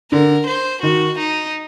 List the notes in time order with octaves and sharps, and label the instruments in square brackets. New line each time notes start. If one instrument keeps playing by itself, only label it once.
[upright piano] D3 [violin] A#4
[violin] C5
[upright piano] D#3 [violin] F#4
[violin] D#4